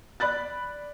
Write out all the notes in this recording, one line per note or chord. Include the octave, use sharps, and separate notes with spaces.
D5 B5 F#6 A6